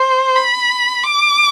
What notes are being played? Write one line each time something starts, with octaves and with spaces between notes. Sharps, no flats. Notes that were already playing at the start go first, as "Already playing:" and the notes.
Already playing: C5
B5
D6